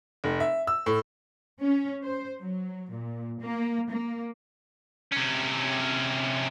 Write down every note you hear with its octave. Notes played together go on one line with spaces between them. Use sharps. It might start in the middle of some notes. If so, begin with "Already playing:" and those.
F1
E5
E6
A2
C#4
C5
F#3
A#2
A#3
A#3
C3 C#4